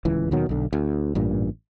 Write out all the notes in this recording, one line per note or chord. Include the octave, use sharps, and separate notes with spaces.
D1 C#2 E3
D#2 B2 D#3 F#3
B1 D3
D2
A1 G2 A#2